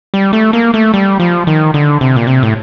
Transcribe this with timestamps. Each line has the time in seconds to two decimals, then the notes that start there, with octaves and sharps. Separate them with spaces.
0.14 G3
0.33 A3
0.53 A#3
0.74 A3
0.94 G3
1.20 F3
1.47 D#3
1.74 D3
2.01 C3
2.16 A#2
2.27 C3
2.43 A2